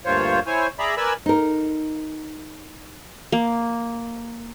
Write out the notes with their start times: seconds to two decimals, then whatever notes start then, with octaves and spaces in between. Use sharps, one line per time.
0.05 D2 G2 A#2 F4 C5 C#5
0.46 E4 C5 C#5 G#5
0.79 G#4 D5 E5 A#5 B5
0.97 A#4 B4 D5 G#5 B5 E6
1.26 D#4 A#4
3.32 A#3